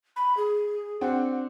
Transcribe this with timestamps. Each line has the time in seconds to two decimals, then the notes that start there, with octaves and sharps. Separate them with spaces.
0.16 B5
0.37 G#4
1.01 C4 D4 F#4 F#5